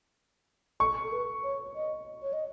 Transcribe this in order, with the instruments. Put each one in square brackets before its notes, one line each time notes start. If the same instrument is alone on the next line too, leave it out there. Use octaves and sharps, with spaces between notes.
[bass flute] A4 [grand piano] C#6
[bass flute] A4
B4
C#5
D#5
C#5
D#5